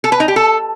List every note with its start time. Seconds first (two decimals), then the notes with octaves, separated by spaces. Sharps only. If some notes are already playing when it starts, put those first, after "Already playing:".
0.04 A4
0.12 B4
0.20 D#4
0.28 G4
0.36 A4